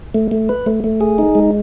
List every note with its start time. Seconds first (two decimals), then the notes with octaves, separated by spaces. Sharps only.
0.14 A3
0.31 A3
0.49 B4
0.66 A3
0.84 A3
1.01 G#4
1.18 D#4
1.35 G#3